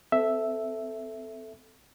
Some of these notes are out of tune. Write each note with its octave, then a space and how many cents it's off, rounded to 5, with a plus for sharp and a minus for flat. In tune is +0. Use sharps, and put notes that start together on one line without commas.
C4 -35 A4 +0 E5 +0